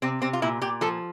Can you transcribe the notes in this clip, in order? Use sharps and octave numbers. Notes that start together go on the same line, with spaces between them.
C3 C4
C3 C4
F4
A#2 E4
A#2 G4
F3 A4